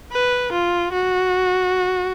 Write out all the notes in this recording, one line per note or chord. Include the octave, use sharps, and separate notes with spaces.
B4
F4
F#4